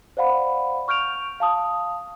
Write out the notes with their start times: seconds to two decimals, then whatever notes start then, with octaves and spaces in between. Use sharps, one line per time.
0.17 C5 D5 F5 F#5 B5
0.88 C#6 F6 G6 D7 F7
1.40 F5 A5 D#6